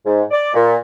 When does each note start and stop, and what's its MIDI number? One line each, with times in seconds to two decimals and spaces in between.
0.06 0.21 44
0.31 0.53 74
0.54 0.75 46